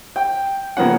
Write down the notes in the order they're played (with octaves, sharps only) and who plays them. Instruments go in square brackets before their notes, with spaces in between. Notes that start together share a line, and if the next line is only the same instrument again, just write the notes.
[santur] G5
[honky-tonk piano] C#3 F3 C#4 [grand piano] A#3 B3 F#5